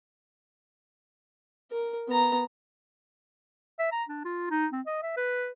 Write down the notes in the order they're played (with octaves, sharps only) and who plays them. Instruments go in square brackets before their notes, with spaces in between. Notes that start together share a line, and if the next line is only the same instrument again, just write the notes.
[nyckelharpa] A#4
B3 A#5
[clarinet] E5
A#5
D4
F4
D#4
C4
D#5
E5
B4